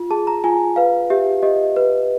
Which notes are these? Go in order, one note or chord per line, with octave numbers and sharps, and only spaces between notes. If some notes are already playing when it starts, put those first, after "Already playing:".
Already playing: F4
G#4 A5
A#5
F4 G#5
B4 F5
G4 E5
G4 D#5
B4